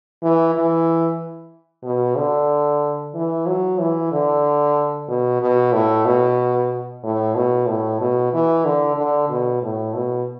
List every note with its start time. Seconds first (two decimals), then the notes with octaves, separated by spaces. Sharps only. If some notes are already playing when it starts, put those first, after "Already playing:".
0.23 E3
0.55 E3
1.84 B2
2.16 D3
3.15 E3
3.47 F#3
3.79 E3
4.12 D3
5.08 B2
5.41 B2
5.73 A2
6.05 B2
7.03 A2
7.35 B2
7.67 A2
8.00 B2
8.33 E3
8.65 D3
8.97 D3
9.29 B2
9.62 A2
9.94 B2